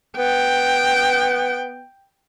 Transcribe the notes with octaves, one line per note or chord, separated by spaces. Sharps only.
B3 G5